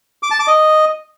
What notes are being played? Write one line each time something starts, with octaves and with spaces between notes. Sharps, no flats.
D6
A5
D6
D#5